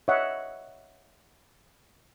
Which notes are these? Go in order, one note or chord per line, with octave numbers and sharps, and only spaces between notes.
C#5 D#5 E5 F#5